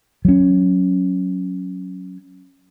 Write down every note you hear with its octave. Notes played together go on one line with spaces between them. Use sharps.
F#3 C#4